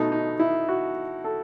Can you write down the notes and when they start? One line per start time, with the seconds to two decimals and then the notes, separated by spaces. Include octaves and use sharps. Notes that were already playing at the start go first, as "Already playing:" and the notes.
Already playing: B2 A3 D#4
0.12 D#4
0.40 E4
0.69 F#4
1.24 A4